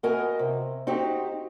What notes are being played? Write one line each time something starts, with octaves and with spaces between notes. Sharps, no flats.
B3 F#4 A#4 D#5 G#5
C3
C4 D#4 F#4 G4